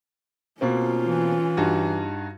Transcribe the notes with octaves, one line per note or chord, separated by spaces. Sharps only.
B2 A#3 C4 C#4 F4
E3
G2 D#4 F#4